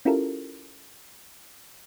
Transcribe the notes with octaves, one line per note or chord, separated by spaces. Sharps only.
C#4 E4 F4 G4 A4 A#4